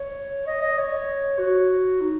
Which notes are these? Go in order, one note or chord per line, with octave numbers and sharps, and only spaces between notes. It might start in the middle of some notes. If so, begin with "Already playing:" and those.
Already playing: C#5
D#5
D#5
C#5
F#4
D#4